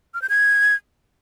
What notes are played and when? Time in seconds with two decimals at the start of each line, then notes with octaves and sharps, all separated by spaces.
0.14 F6
0.22 G6
0.29 G#6